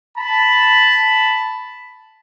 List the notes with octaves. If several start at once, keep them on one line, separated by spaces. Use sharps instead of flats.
A5 B5